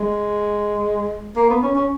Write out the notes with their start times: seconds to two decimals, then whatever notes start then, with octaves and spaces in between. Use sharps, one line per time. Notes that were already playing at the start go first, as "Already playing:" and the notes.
Already playing: G#3
1.36 A#3
1.50 B3
1.63 C#4
1.75 C#4